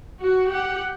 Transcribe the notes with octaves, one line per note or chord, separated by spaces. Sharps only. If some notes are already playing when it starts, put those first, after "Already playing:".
F#4
G4 F#5